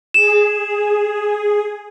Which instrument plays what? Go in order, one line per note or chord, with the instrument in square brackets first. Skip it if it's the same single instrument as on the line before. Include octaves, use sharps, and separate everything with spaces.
[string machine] G#4 [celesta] E7